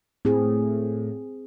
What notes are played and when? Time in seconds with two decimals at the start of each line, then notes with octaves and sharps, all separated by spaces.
0.25 A2 C4 G#4